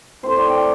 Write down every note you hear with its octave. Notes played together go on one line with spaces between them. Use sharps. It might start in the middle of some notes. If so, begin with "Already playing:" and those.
A2 A3 C4 C5
D5
G5